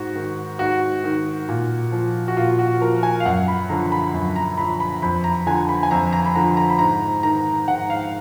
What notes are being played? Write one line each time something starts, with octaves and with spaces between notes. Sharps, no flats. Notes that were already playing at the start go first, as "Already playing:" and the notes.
Already playing: G#2 F#4
D#3
G#2 F#4
D#3
A#2
F3
F#4
A#2 F4
F#4
F3 A#4
G#5
F5
F#2 F#5
B5
D3 F3 A#5
B5
F#2
A#5
D3 F3 B5
B5
F2 B5
A#5
D3 F3 G#5
B5
G#5
F2 A#5
A#5
B5
D3 F3 A#5
A#5
B5
G#2 A#5
D#3 A#5
G#2 F#5
F5